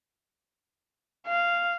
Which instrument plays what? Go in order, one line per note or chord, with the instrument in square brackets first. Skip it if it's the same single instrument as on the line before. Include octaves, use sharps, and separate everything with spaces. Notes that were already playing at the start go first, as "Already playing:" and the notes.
[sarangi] F5